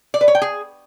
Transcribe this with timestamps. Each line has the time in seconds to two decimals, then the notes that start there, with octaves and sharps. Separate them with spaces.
0.14 D5
0.21 B4
0.28 C#5
0.35 G5
0.42 G#4